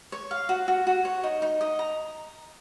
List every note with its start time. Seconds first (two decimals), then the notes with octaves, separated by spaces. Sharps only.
0.12 C#5
0.31 F5
0.49 F#4
0.68 F#4
0.87 F#4
1.05 C#5
1.24 D#4
1.42 D#4
1.61 D#5
1.79 A#5